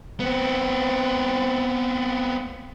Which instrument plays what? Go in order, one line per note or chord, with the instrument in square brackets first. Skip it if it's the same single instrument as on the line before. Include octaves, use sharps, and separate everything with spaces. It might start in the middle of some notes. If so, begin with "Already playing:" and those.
[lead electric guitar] B3 C4